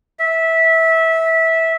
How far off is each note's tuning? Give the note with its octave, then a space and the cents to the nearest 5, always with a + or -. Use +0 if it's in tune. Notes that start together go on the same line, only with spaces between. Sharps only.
E5 -15